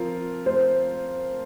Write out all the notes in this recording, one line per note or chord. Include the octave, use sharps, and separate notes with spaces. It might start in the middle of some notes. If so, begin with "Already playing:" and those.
Already playing: F3 C4 F4 A#4
C5